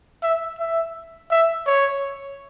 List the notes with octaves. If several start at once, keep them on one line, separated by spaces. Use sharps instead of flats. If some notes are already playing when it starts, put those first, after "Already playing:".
E5
E5
E5
C#5